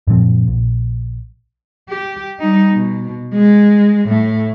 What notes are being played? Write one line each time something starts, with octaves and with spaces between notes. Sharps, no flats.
F#2 A#2 F3 C4
A#1
G4
G3 D#4
B2
G#3
A2 A3